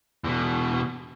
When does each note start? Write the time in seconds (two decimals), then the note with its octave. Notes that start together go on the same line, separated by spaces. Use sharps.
0.24 E2 B2